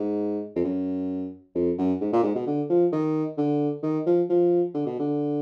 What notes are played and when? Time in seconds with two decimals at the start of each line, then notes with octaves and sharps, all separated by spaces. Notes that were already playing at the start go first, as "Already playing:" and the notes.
Already playing: G#2
0.56 F2
0.64 F#2
1.55 F2
1.78 F#2
2.01 G#2
2.13 A#2
2.23 G#2
2.35 B2
2.46 D3
2.70 F3
2.92 D#3
3.37 D3
3.83 D#3
4.06 F3
4.30 F3
4.74 D3
4.87 B2
4.99 D3